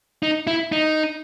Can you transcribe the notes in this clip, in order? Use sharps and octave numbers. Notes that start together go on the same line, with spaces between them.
D#4
E4
D#4